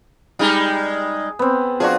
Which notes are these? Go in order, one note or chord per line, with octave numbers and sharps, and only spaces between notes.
G3 G#3 D#4 G#4
B3 C4
F3 D4 F#4 G#4